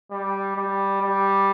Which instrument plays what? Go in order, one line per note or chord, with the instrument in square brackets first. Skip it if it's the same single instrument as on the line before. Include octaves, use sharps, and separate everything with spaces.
[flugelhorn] G3
G3
G3